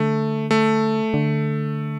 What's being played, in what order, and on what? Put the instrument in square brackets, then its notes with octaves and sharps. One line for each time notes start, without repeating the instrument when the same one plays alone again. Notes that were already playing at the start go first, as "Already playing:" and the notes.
Already playing: [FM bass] D3 [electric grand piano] A3
[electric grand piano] A3
[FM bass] D3